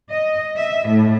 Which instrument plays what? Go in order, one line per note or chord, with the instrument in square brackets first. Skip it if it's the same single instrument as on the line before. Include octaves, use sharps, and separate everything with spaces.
[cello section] D#5
E5
A2